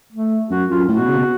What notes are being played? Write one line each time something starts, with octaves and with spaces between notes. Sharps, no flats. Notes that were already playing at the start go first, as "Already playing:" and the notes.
A3
F#2 F#4
F#2 F4
A2 F#4
B2
C#3
B2